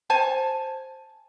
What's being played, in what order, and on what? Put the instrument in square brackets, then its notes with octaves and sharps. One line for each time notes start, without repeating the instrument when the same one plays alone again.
[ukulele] C5 G#5 A5